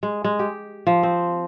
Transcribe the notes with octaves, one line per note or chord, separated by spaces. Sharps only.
G#3
G#3
G4
F3
C4